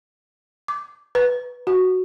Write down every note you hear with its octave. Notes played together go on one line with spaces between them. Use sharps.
D6
B4
F#4